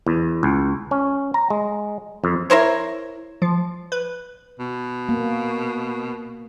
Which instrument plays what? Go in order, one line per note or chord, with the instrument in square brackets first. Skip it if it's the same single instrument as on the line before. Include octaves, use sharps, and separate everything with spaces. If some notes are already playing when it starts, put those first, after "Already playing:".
[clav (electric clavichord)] E2
C#2
C#4
A#5
G#3
F2
[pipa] E4 A#4 C5 C#5
[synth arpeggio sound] F3
B4
[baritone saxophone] B2
[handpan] A#3